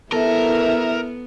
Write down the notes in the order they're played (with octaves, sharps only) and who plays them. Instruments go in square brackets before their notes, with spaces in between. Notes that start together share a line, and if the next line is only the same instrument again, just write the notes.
[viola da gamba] B3 [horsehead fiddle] E4 E5 [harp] A4 [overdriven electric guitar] A#4